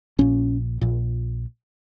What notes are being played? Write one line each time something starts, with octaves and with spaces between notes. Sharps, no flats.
A#1 A#2 C#4
A#1 A#2